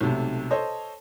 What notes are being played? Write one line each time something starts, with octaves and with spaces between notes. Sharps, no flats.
B1 G#2 C3 A3
A4 C5 C#5 D#5